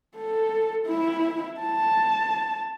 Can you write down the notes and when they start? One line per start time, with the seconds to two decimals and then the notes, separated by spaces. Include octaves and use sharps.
0.17 A4
0.86 E4
1.60 A5